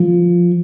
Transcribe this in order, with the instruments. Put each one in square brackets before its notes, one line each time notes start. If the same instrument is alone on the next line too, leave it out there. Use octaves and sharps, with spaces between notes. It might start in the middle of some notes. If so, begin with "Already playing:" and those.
Already playing: [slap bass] F3